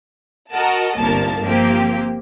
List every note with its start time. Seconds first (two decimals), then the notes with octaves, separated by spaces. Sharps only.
0.52 F#4 A#4 D#5 F#5 A5
0.98 G1 C2 A#3 A#4 A5 A6
1.44 F3 A#3 C4 G4